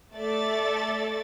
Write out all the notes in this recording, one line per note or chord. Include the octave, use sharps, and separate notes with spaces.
A3 A4 D5 E5 A6